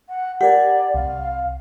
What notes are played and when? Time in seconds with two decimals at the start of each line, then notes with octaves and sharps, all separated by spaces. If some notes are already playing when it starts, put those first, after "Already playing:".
0.08 F#5
0.41 G4 A#4 D5 F#5 G#5
0.94 C2 F5